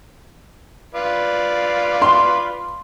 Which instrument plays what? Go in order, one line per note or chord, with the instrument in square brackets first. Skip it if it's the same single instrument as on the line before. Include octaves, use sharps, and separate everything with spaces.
[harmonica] F4 B4 D5
[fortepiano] C6